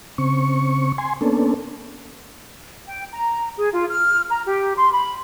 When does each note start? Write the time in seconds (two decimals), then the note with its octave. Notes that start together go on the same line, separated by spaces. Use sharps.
0.18 C#3 C4 C#6
0.98 G#5 C6
1.21 A#3 B3 C#4 D4 A4
2.87 G5
3.12 A#5
3.56 G#4
3.72 F4
3.90 F6
4.29 A#5
4.46 G4
4.76 C6
4.92 B5